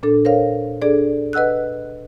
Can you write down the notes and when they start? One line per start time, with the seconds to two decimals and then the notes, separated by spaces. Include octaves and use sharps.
0.03 A#2 D4 A4
0.25 A#4 C5 C#5 F5
0.82 D4 G#4 A4 D5
1.33 B4 D#5 F#5 E6 F#6